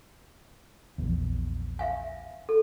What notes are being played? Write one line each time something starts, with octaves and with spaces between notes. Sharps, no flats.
A#1 E2
E5 F5 G#5
A4